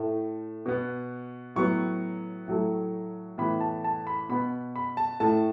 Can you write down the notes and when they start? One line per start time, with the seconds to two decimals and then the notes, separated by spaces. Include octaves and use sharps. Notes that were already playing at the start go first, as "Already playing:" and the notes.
Already playing: A2 A3
0.66 B2 B3
1.56 A2 F#3 B3 C#6
2.48 A2 F#3 A3
3.38 A2 E3 B3 B5
3.61 A5
3.84 A5
4.07 B5
4.29 B2 B3 B5
4.76 B5
4.97 A5
5.20 A2 A3 A5